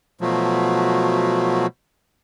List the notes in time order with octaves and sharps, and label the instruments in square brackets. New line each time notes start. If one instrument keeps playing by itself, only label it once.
[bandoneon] B2 F3 F#3 A3